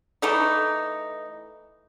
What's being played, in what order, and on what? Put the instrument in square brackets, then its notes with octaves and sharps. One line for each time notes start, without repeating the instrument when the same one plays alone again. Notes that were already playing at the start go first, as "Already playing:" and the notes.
[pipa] E3 A3 D#4